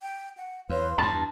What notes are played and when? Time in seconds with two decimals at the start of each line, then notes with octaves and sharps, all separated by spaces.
0.02 G5
0.37 F#5
0.69 E2 B4 C#5 F5 C6
0.98 E2 G2 A5 A#5